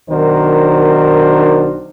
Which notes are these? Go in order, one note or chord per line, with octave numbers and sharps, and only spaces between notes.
B1 D#3 D4 F#4 A#4 C5